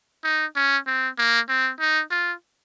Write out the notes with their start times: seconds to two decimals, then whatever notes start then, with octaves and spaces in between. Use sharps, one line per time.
0.24 D#4
0.56 C#4
0.87 C4
1.18 A#3
1.49 C4
1.80 D#4
2.11 F4